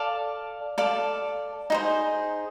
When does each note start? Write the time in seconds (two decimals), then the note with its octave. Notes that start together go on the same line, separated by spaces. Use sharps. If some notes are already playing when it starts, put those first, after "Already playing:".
Already playing: A4 D5 F5 A5
0.78 A4 D5 F5 A5
1.70 D#4 G#4 C5